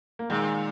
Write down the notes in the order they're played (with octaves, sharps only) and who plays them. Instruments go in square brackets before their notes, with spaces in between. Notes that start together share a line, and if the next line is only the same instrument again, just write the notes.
[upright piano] A#3
[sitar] A#2 [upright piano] D#3 G#3